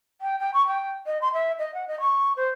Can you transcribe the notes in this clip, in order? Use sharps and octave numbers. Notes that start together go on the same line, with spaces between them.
G5
G5
C#6
G5
D#5
C6
E5
D#5
F#5
D#5
C#6
C5